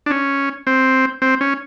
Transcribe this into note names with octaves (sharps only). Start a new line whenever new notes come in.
D4
C#4
C4
C4
C#4